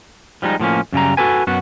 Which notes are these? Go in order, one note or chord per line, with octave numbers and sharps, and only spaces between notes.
F3 G3 G#3 D#4
A2 F3 A#3 C#4
F#2 C#3 G3 A#5
F#4 G4 A4 B4 G#5
F#2 B3 F#4